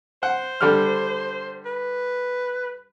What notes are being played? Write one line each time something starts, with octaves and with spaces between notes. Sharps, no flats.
C5 F#5
D3 G3 F6
B4